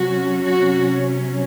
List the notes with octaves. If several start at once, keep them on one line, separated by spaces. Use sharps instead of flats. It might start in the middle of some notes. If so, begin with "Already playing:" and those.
Already playing: C3 F#3 C#4 F#4
F#4